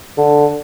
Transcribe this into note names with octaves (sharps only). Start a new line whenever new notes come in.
D3